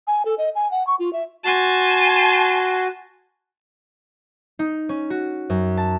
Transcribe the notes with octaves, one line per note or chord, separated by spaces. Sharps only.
G#5
A4
D#5
G#5
F#5
C#6
F4
E5
F#4 G#5 A5 C6
D#4
C#4
F#4
F#2
A5